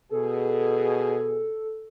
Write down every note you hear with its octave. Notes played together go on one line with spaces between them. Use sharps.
B2 G#4 A4